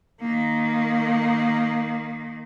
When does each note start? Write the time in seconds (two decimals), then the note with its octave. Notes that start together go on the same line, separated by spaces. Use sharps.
0.20 D#3 A#3